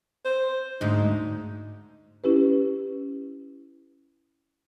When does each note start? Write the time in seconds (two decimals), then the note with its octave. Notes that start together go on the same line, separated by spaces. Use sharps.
0.25 C5
0.81 D2 G#2 D#4
2.24 C#4 E4 G4 B4